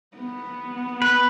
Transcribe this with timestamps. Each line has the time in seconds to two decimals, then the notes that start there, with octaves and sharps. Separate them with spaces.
0.17 B3
1.02 B4